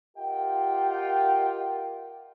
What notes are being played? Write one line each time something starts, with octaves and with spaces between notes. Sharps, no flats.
F4 G4 A#4 D#5 F#5 G5